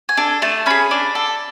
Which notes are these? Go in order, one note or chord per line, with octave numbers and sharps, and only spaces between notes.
G#5
D4 A4
A3 A5
C#4 G#4 B5
D4
A4